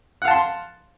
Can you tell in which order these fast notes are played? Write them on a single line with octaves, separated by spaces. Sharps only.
F#5 F5 A5 C6